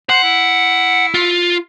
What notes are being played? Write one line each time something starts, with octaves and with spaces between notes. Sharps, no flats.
C5 F#5
E4
F4